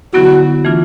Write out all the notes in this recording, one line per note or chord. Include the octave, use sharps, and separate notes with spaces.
D3 F#3 B3 E4 F#4
E3 A3 D4 F4